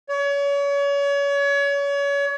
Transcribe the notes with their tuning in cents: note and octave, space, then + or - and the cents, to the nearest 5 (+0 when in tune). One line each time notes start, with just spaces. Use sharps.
C#5 +35